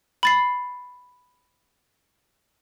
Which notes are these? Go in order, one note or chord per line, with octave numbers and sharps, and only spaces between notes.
B5 A6 C7